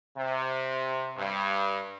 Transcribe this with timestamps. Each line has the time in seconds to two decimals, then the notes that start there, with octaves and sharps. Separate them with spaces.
0.17 C3
1.17 G2